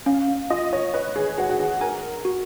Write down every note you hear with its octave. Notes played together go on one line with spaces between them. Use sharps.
C#4 F5
F5
F4 D#5
C#5
B4 D#5
G#4
F#4 B4
F#4
G#4
A#4 G#5
F#4